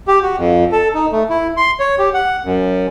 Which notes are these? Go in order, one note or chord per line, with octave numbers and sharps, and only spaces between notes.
G4
F#4
F2
A4
D#4
A3
E4
C6
C#5
G4
F#5
F#2